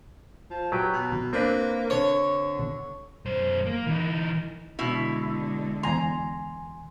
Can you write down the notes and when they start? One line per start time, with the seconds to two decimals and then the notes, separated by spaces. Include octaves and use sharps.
0.50 F3
0.72 F#3 G4 B4
0.93 B2
1.33 A#3 C4 D4 B4
1.90 D3 C#5
3.26 F#2 C5
3.66 A#3
3.87 E3 D#4
4.79 B2 D3 G#3 E4
5.83 E2 G#5 A#5 C6